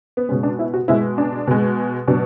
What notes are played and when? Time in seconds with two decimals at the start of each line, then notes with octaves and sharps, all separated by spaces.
0.17 B3
0.29 B2 G#3 C#4
0.43 D4
0.59 E4
0.74 F#4
0.88 B2 G#3 E4
1.18 D4
1.47 B2 G#3
2.08 B2 F#3 D4